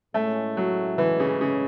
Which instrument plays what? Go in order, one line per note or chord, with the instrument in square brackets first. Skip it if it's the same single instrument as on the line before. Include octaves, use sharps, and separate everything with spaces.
[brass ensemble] A2 G#3 C#4 E4 [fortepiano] A3
[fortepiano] F#3
E3
C#3
C#3